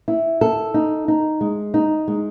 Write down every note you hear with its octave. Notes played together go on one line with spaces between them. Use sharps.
E4
A4
D#4
D#4
G#3
D#4
G#3